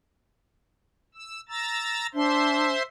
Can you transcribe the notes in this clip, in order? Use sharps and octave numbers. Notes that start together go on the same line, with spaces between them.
E6
A#5 E6 A6
D4 C5 E5 C6